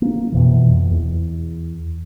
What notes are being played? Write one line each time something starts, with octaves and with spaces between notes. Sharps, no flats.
A#3
F2 B2 E3
E2